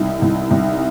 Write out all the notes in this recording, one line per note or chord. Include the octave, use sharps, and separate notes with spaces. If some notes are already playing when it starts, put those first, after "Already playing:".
Already playing: C2 D#4
C2
C2